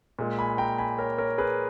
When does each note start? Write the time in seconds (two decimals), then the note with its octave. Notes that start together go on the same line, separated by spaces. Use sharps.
0.19 A#2 G#3
0.39 G#5 B5
0.58 G5 A#5
0.78 G#5 B5
0.98 A#4 C#5
1.18 A#4 C#5
1.38 G#4 B4